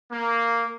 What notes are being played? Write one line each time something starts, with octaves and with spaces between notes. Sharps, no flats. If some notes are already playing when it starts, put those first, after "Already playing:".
A#3